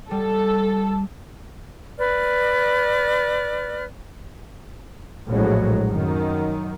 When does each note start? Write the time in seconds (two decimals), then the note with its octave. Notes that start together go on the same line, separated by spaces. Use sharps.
0.11 G3 A4
1.98 B4 D5 F6
5.28 A#1 A2 F#3 G#3
5.88 F#2 D#3